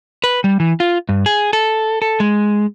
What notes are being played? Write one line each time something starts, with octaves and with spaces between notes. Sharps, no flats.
B4
G3
E3
F4
G2
G#4
A4
A4
G#3